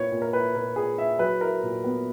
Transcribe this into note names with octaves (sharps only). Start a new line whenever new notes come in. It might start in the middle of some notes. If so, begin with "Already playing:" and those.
Already playing: A#2 A#3 E4 B4 C#5
A#2
A#4
E4 B4
A#2 A#4
A#2 G#4
E4 E5
F#3 B4
E4 A#4
A#2
B3